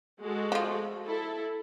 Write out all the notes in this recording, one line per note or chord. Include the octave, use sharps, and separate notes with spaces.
G#3 F#4 A4
F3 F4
E4 A4